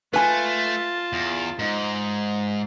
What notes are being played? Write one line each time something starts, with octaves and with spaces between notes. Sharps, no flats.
A3 F4 B4 G#5 A5
E2
G#2 D#4 C6